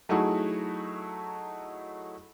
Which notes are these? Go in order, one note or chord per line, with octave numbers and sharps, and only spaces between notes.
F#3 A3 D#4 E4 F#4 G#4